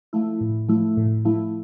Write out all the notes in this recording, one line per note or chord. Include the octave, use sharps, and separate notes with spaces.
F3 A3 E4
A2
F3 A3 E4
A2
F3 A3 E4